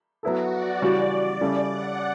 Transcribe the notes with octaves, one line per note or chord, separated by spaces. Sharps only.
F#3 B3 E4 F#4 A4
D5
C#3 E3 G3 C#4 F#4
C#3 G3 C#4 E4 A4 D5
F#5